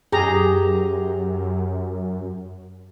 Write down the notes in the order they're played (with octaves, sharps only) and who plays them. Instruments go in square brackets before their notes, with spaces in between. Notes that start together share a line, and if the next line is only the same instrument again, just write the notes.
[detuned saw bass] F#2 [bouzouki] G4 [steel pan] G#4 A#5